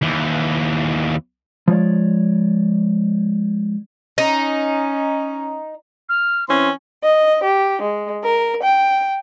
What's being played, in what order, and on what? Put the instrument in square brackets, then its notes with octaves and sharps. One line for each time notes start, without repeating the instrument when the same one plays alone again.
[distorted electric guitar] D#2 E3
[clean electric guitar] F3 G#3 C#5 D5
[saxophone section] C#4 [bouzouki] D#4
[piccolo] F6
[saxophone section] E3 C4 C#4 [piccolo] C6
[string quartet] D#5
G4
G#3
A#4
G5